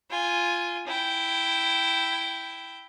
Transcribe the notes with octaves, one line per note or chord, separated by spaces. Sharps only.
F4 G#5
E4 G5